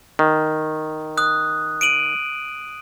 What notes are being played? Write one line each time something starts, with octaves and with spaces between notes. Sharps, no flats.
D#3
D#6 F#6
D7 D#7 F#7